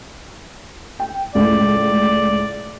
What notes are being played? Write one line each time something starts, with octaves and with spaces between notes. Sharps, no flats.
G5
C#2 A2 D5